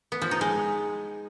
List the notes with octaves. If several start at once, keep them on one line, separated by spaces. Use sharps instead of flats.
B3
F3
D#4
G#3